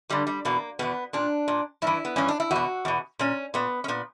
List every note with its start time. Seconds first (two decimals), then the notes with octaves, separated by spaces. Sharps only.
0.10 G2 D3 G3
0.27 G3
0.45 E2 B2 A#3
0.79 E2 B2 B3
1.13 A#2 D4
1.48 A#2
1.82 G2 E3 E4
2.05 B3
2.16 G2 E3 C#4
2.28 D4
2.40 E4
2.51 E2 B2 F#4
2.85 E2 B2
3.19 A#2 C#4
3.54 A#2 B3
3.84 C#4
3.88 A#2 B3